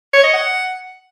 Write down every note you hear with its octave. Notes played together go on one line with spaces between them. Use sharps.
C#5
D#5
F#5